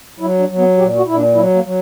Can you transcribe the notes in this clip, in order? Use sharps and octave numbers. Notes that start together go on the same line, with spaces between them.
F#3 E4
D4
F#3
B3
A#2 G4
F#4
A#2 E4
D4
F#3 E4
A#3
F#3